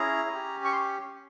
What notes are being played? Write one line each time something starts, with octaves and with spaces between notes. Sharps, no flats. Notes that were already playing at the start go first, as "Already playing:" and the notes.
Already playing: C#4 E4 G#4 A#5
C#4 G4
C#6
C6